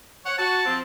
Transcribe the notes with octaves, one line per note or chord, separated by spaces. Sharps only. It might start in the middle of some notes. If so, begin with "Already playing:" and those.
C#5 F#5
F#4 A5
F3 C4